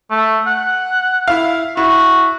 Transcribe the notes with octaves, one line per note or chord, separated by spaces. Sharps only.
A3
F#5
E4 F5
E4 F#4